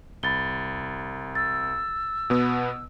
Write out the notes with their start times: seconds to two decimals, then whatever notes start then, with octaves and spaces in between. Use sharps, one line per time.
0.23 C2 B5 A6 G7
1.35 E6 A6
2.30 B2 B3